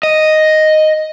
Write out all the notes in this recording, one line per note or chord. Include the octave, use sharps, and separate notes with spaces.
D#5